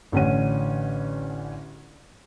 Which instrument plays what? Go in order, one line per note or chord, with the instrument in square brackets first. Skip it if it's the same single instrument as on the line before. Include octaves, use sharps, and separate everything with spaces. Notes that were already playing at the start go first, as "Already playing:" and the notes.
[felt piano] A1 D3 C#4 F#5 D#7